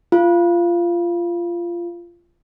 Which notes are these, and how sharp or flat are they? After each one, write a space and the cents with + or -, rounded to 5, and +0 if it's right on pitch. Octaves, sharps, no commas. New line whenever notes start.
F4 -15